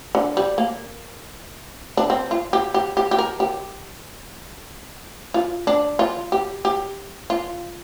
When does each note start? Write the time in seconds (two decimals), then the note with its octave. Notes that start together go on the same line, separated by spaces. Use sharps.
0.15 D3
0.37 G3
0.58 A#3
1.97 D4
2.10 C4
2.31 F4
2.53 G4
2.74 G4
2.97 G4
3.11 G4
3.19 A#4
3.40 G4
5.34 F4
5.67 D4
5.99 F4
6.32 G4
6.65 G4
7.30 F4